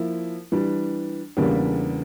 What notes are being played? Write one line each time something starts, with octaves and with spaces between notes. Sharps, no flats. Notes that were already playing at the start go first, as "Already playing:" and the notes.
Already playing: F3 A#3 E4
E3 G3 D4
E2 C#3 G3 A#3 D4